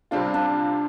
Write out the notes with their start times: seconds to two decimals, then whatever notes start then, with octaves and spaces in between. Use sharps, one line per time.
0.11 C3 G3 C4 D4 F4
0.34 D4